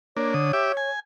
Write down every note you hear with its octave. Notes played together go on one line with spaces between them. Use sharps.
A#3 D4 C#5
D3 D#6
G4 E5 D6
G#5